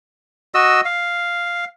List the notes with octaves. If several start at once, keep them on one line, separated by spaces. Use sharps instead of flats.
F#4 D#5 E6
F5